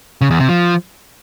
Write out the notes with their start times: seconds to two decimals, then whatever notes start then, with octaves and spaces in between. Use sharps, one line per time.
0.21 C#3
0.30 E2
0.40 C3
0.49 F3